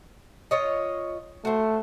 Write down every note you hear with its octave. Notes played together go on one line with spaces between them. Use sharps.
F4 C#5 D#5
A3 F#4 C5